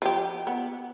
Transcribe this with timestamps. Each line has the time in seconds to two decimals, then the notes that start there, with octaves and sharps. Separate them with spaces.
0.02 F3 G4
0.47 B3